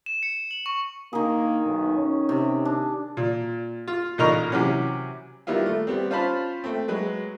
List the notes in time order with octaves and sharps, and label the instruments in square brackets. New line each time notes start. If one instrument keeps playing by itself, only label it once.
[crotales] E7
C#7
F#7
C#6
[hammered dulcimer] D#3 G#4 [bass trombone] A#3
[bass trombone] B1
C#4
[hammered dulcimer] C3
D4
[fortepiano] A#2
F4
A1 A#2 D#4 A#4 A#5 C#6
C3 E3 F#3 C#4
D#3 G3 B3 E4 F4
A3
G3 B3 C4
C#4 F4 C5 F5 A5 B5
A3 C4
F#3 G#3 B4